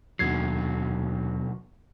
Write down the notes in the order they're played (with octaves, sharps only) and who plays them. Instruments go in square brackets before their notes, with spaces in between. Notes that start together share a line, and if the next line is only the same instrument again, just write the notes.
[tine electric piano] D#2 G#6 C7 [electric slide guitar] B2 D3 F#3